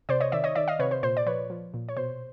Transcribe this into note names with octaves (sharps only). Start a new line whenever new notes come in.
C3 C5 D5
C#5 D#5
D#3 D5 E5
C#5 D#5
D#3 D5 E5
D#5 F5
C3 B4 C#5
C5
A#2 C5
D5
F3 B4 C#5
F3
A#2
C#5
B2 C5